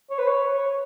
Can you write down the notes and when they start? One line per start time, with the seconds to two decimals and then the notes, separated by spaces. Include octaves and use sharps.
0.10 C#5
0.19 B4
0.27 C#5
0.54 C#5